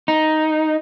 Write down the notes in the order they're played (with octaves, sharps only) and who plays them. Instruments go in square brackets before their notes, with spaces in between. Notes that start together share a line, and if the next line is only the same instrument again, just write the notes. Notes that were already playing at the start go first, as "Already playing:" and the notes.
[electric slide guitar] D#4